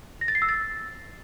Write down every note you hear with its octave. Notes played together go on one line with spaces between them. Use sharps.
A#6
A6
C7
E6
A6